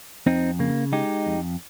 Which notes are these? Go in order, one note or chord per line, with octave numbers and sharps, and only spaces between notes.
F2 C4 D#4
C#3 A#3
G#3 D#4 G4
F2